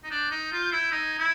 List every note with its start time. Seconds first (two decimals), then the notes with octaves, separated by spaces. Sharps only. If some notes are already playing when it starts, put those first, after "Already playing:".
0.04 D#4
0.10 D4 G6
0.31 D#4
0.52 F4
0.72 E4
0.91 D#4 G#6
1.19 E4